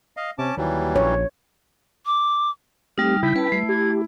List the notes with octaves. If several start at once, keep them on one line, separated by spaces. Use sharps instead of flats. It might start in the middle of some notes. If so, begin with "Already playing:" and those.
D#5 F5
C3 C#4 A5 D6
D#2 E3 F#3 G3
A#1 C#5
D6
G3 A3 C4 D#4 G4 F6
C#3 E4 G6 B6
C#4 B4 G5 A5
G3 A3
G4 G#6